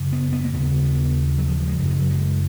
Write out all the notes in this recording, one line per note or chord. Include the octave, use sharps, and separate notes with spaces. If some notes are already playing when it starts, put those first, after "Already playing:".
Already playing: F#2 C#3
B3
B3
A#3
D#2 C#3 B3
B3
F#3
F3
G#3
F#2 C#3 F#3
F3
F#3
G#3